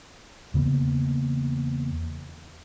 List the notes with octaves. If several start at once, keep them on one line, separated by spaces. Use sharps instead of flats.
E2 C#3 A#3 B3